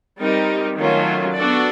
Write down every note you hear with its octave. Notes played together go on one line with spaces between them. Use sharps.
G3 C4 D#4 G4 A#4
D#3 F#3 A3 C#4 F4
B3 D4 F#4 A4 D5